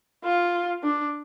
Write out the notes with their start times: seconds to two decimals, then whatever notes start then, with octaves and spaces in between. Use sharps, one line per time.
0.24 F4
0.83 D4